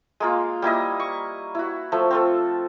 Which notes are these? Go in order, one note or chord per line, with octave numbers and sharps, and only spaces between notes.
G#3 A#3 F4
G3 A#3 E4 D#5
C#6
E4 F#4
F3 A3
C4 F4 A4